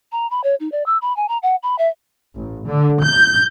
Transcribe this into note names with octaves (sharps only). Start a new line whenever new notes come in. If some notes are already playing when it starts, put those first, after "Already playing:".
A#5
B5
C#5
D#4
D5
E6
B5
G#5
A#5
F#5
B5
E5
A1
D3
G6